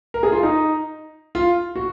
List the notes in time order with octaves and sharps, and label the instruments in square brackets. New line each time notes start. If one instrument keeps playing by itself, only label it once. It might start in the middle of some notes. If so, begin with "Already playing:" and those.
[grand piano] A#4
G#4
F4
D#4
F4
F#4